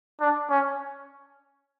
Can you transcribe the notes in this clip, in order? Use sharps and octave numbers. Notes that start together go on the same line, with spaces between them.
D4
C#4